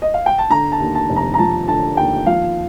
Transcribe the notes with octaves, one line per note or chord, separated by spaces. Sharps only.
D#5
F5
G5
A5
D3 A#5
A5
D#2
A5
F1
A#5
A#5
F3 A5
D3 A5
D#2 G5
F3 F5